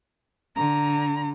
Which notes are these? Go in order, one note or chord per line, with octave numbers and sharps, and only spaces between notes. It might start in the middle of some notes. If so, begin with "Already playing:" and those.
D3 A#5